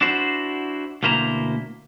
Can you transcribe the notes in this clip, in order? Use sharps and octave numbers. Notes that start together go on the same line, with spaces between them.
D4 E4 F#4 C5
D2 B2 A#3 E4 C5 A#5